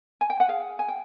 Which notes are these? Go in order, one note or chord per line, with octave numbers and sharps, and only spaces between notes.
G#5
G5
F#5
G#4 F5
G#5
G5